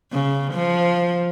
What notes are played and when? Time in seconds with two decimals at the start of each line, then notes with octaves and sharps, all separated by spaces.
0.12 C#3
0.53 F3